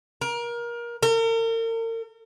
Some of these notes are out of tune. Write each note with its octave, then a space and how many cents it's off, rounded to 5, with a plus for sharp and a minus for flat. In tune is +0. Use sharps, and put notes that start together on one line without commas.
A#4 +25
A#4 -40